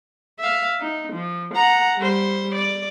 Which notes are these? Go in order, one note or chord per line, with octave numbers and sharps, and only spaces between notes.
E5 F5
D#4
F3
F#5 A#5
G3 C5
D5